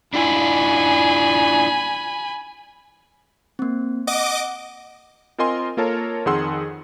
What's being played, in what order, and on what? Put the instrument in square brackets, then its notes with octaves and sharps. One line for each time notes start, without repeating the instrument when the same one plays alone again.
[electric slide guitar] D4 E4 F4 [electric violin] G#5 B5
[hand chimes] A#3 C4
[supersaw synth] D#5 D6 [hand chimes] F#5
[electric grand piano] C4 F4 A#4 D#5 G#5 C6
A#3 F4 A4 A#4 C#5 A5
F2 D#3 G#4 F#5 C6 E6